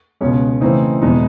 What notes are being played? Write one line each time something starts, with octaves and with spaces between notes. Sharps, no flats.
C#2 B2 G#3 C#4 C#5
C#3 E3 A3 C4 D#4
E2 B2 G#3 B3 D#4